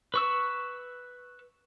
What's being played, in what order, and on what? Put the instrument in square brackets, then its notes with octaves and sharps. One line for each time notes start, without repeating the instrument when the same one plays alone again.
[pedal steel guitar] B4 C#6 E6